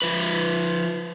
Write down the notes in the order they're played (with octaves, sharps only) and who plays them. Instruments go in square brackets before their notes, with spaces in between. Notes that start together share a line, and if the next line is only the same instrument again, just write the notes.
[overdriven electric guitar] F3 B4